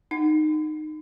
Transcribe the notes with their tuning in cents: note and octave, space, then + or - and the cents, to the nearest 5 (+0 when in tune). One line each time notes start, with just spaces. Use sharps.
D#4 -20 F#5 +0